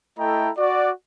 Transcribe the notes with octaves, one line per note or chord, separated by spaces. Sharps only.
A3 E4 A4 D#5 G5 A#5
F#4 D5